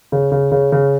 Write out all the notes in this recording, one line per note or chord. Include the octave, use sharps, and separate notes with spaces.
C#3
C#3
C#3
C#3